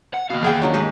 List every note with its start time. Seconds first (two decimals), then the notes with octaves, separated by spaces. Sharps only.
0.14 F#5
0.30 D#2 B2 F5
0.42 E2 G#4 G5
0.62 D#3 F#3 C#4 D4
0.74 G#2 G4 G#4 B4